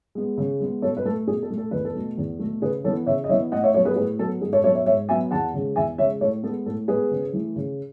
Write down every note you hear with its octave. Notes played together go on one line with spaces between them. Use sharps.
G#3 B3
C#3
G#3 B3
B2 A4 C#5
B4
A3 A4
B2 G#4
A4
A3
A4
E2 B4
A4
B2 A3
E2
B2 A3
C#3 G#4 B4
E3 B3 A4 C#5
C#3 C#5 E5
D#5
E3 B3 C#5 E5
A2 D#5 F#5
C#5 E5
F#3 B3 A4 C#5
G#4 B4
A2 G#4 B4
F#3 B3 A4
G#2 G#4
A4 C#5
F#3 B3 A4 C#5
C#5 E5
G#2 C#5 E5
F#3 B3 E5 G#5
E2 F#5 A5
C#3 G#3
E2 E5 G#5
C#3 G#3 C#5 E5
A2 A4 C#5
G#3 B3 A4
A2 A4
G#3 B3 G#4 B4
C#3
E3 A3
C#3